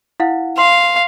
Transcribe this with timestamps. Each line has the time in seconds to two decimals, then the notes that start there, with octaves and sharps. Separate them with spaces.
0.20 E4 F5 F#5
0.58 F5 C6